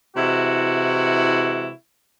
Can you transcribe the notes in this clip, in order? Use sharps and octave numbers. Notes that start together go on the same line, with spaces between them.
C3 E3 G#3 E4 F#4